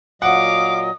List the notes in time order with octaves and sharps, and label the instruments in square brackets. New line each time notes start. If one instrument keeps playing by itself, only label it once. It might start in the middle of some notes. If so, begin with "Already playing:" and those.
[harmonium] A#2 F#3 D#5 [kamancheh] F5 D6 [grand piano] F#5 [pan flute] D#6